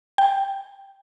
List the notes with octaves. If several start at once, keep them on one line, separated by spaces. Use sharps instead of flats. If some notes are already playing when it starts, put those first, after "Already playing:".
G5